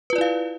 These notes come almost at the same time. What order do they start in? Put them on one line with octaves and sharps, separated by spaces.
B4 F4 D5 E4 F5